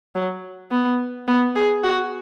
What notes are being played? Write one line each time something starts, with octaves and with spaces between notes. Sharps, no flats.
F#3
B3
B3
G#4
F#4